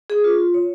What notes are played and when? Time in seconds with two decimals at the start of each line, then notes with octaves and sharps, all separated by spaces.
0.10 G#4
0.24 F4
0.38 F4
0.54 C#5